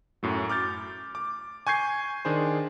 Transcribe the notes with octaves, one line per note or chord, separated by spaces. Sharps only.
F#2 A2 F#3
D6 F6 G6 A6
D6
G#5 C#6 G6 G#6 C7
D#3 D4 G#4 C5